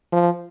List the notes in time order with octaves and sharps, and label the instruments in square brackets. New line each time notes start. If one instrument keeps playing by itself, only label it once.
[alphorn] F3